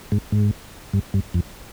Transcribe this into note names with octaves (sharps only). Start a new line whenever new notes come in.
G#2
G#2
G2
G2
F2